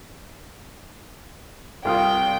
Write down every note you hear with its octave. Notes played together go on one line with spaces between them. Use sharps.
C2 F4 G5 D#6